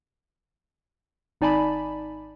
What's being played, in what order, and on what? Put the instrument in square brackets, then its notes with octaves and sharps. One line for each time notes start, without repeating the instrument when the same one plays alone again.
[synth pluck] G#1 D#4 D5 G#5 A5 B5